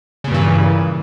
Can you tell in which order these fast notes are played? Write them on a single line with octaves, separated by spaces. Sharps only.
C#3 A#2 G2 E3